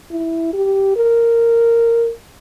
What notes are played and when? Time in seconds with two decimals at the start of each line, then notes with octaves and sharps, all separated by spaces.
0.11 E4
0.54 G4
0.96 A#4